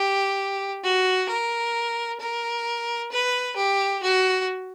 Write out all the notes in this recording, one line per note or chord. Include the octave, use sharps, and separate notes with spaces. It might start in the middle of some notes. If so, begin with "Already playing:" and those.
Already playing: G4
F#4
A#4
A#4
B4
G4
F#4